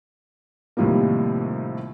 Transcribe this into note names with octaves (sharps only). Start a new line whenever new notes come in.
D#2 A2 C3 F3 G3 A#3